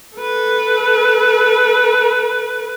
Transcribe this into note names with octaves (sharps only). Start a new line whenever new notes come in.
A4 B4